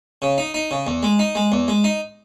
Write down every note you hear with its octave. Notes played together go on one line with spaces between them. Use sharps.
C#3
D#4
D#4
C#3
E2
G#3
D#4
G#3
E2
G#3
D#4